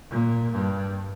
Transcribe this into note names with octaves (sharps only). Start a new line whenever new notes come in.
A#2
G2